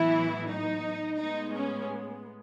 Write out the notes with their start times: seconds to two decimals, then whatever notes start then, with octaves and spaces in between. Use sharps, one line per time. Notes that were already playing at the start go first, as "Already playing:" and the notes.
Already playing: A2 E3 F#3 B3 E4
0.49 D#4
1.18 A2 G#3 B3 D#4
1.54 C#4